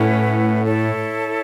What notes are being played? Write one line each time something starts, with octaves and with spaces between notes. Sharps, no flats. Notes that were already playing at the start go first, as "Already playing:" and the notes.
Already playing: A2 C#4 E4 B4 F#5
E4 A4 C#5